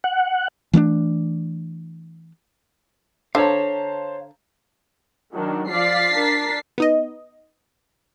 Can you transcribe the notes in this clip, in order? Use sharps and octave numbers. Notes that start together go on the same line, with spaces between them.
F#5
E3 A3 B3 D4
D3 C5 C#5 F5 A5 A#5
D#3 F#3 D4
F3 D5 F5 A6 B6 C7
D4 A#4
B3 D#4 D#5